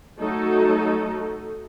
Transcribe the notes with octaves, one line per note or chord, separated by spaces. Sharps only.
F#3 A3 D#4 F#4 A4